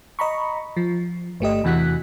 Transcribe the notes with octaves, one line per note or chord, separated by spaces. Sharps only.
D#5 A#5 B5 C#6
F3
G1 A3 G4 D#5
E2 C3 E3 F#4 F#6 B6